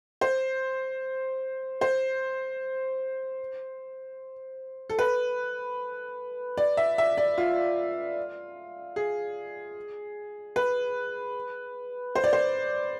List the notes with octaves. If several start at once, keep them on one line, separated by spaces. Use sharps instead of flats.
C5
C5
A4
B4
D5
E5
E5
D5
F4
G#4
B4
C5
D5
C5